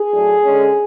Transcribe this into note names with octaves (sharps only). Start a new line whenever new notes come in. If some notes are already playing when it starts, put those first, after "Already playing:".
Already playing: G#4
A2 F#3 A3 D4
D3 G#3 C#4